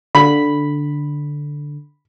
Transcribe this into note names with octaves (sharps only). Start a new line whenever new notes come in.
D3 B5